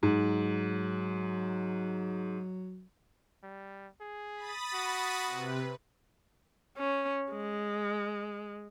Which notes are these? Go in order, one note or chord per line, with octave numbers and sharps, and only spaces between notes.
G#2 F#3
G3
G#4
B5 D#6 A6
F#4
C3 B4
C#4
G#3